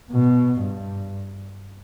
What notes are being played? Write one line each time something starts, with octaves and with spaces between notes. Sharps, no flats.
B2
G2